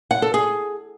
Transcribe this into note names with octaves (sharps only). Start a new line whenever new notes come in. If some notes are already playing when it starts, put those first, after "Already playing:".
F#5
A4
G#4